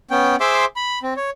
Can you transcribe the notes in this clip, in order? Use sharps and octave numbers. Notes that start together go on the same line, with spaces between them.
B3 C#4 G5
G#4 C5 E5 C6 D6 E6
B5
C4
C#5